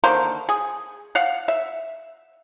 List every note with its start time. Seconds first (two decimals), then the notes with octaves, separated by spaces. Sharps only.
0.04 D3 D#3 A#3 C5
0.49 G#4
1.15 F5 F#5
1.48 E5